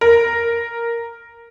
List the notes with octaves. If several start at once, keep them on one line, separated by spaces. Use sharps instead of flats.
A#4